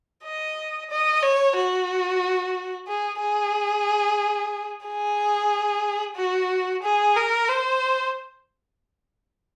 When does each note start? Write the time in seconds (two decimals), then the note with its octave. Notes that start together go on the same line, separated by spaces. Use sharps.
0.25 D#5
0.91 D#5
1.23 C#5
1.56 F#4
2.88 G#4
3.20 G#4
4.86 G#4
6.16 F#4
6.83 G#4
7.16 A#4
7.49 C5